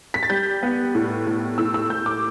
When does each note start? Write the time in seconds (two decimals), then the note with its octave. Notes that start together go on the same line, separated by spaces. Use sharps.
0.14 B6
0.23 A6
0.30 G3 G6
0.63 B3
0.95 A2
1.27 A2
1.58 A2 E6
1.74 E6
1.90 A2 G6
2.06 D6